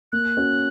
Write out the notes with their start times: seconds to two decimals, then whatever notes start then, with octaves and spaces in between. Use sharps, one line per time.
0.12 A#3 F#6
0.37 C#4 F#4